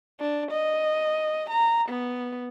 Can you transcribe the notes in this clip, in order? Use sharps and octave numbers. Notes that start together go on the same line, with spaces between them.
D4
D#5
A#5
B3